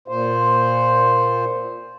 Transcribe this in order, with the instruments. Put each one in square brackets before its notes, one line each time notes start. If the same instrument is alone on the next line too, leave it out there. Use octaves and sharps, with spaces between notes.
[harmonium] A#2 C5